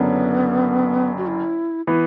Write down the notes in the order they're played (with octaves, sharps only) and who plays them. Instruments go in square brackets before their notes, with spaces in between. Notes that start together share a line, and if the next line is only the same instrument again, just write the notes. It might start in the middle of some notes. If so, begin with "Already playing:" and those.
Already playing: [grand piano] F#1 F#2 D3 [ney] B3
[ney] F#4
E4
[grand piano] E3 B3 [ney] E4